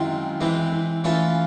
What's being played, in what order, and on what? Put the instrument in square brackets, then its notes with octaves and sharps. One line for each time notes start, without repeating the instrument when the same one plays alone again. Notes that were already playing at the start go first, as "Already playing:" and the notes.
Already playing: [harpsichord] F#2 D#3 G#3 C4 F4 [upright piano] E4
[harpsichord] E3 G#3 C4 [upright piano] E4
[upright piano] E4
[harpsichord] E3 A3 C#4 F4 A4